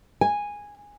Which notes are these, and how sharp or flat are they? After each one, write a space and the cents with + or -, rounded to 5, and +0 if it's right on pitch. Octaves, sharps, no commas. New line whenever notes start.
G#5 -10